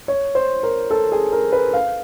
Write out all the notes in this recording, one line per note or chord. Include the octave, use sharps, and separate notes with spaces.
C#5
C5
A#4
A4
G#4
A#4
B4
F5